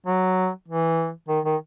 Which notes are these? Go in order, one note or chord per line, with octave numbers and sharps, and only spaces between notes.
F#3
E3
D#3
D#3